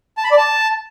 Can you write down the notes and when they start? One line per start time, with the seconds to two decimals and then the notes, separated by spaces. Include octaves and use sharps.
0.17 A5
0.24 B5
0.31 D5
0.37 A5